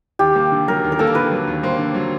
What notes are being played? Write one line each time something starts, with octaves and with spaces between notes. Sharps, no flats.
D#2 G4
A#3
D3
F#3 A#4
D#2
A#4
A#3 A4
A#4
D3 B4
F#3
D#2
A#3 C5
D3
F#3